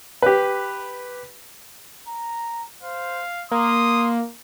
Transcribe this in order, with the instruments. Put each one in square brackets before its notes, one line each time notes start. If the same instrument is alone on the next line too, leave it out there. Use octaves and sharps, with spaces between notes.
[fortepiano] G4 B4
[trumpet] A#5
[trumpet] C5 [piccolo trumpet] F5
[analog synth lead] A#3 [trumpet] C6 [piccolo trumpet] D#6